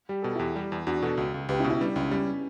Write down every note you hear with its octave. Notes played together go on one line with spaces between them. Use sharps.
G3 G4
B2 A4
E2 E4 G4
G3
E2
E2 D4 F#4
B2 F#4 A4
C#2
C#2
C#2 G4 B4
C#4 E4
B2
C#4 E4
G3 B3 D4
C#2 C#4
G3 C#4